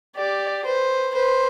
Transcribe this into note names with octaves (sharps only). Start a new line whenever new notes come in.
G4 D5
B4 C5
B4 C5